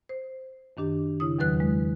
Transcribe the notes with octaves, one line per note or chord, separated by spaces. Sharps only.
C5
F#2 D#3 D4 G4
C#3 E4 D#6
E2 D#3 F#3 B4 F#6
G#3